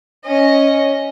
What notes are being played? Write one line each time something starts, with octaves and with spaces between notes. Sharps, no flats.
C#4 D#5